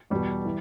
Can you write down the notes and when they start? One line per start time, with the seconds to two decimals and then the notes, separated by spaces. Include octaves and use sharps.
0.10 E2 B2 G3
0.45 E3